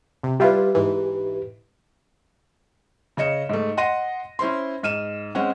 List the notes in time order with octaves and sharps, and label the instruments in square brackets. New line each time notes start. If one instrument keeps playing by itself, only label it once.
[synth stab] C3
[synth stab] G3 E4 F4 [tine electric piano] G4 B4
[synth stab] G#2 E3
[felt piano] C#3 C#5 D#5 C#7 E7
G#2 A3
D#5 F#5 C6 A#6 D#7
C#4 E4 C5 C6
G#2 F6 D#7 E7
G#3 C4 C#4 F#5